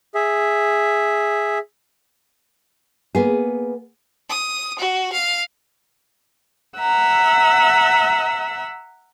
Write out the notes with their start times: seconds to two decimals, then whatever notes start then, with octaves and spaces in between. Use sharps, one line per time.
0.15 G#4 E5
3.15 A#3 B3 G#4
4.30 D#6
4.79 F#4
5.12 F5
6.79 E5 F#5 A#5 E6